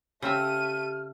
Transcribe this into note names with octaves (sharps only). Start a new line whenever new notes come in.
C#3 A3 C4 G4 E5 F6 D#7